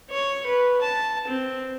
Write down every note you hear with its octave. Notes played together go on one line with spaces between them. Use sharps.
C#5
B4
A5
C4